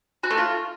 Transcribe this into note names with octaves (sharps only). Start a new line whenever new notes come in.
F#4
A3
F4